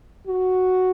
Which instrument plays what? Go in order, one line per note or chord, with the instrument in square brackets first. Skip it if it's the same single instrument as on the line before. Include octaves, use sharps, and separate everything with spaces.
[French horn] F#4